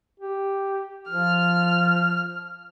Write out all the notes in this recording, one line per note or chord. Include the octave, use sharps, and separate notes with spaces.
G4
F3 F6